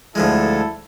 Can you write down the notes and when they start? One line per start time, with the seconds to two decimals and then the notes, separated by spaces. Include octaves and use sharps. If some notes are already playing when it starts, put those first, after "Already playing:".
0.15 D2 F3 G#3 E4 A4